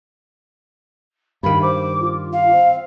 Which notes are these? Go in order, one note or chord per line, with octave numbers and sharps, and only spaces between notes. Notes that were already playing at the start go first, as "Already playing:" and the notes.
G2 D#3 F5 B5
C5 D6
F4
F5
C4